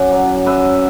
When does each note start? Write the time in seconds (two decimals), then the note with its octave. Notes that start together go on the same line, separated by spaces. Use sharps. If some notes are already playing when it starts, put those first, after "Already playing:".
Already playing: F#2 D5 F#5
0.12 F#3
0.46 F#2 B4 E5